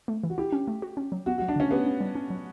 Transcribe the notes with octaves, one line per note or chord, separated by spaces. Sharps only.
A3
E3
F#4
E4 G4
C#4
A3
F#4
C#4
F#3
B3 F#4
F#4
F#3
D4
D3 C#4
B3 G4
C#4
G3
C#4
F#3